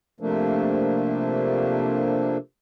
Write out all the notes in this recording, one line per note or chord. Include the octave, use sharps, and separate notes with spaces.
C3 F3 A3 A#3 D4